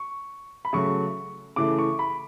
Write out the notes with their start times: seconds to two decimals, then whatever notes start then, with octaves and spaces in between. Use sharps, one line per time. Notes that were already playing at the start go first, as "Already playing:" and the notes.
Already playing: C#6
0.65 B5
0.73 C#3 F#3 A3 C#6
1.56 C#3 E3 A3 D6
1.78 C#6
1.99 B5